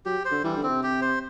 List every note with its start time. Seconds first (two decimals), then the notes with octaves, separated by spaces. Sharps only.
0.06 F#3 G4
0.25 C5
0.32 D3
0.43 E3 G3
0.57 D3
0.63 C4
0.69 C3
0.83 G4
1.01 C5